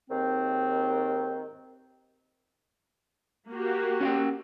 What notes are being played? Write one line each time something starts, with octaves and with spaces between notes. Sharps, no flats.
D#2 G#2 D#3 C4
A#3 F#4 G4
C#4 F5 G5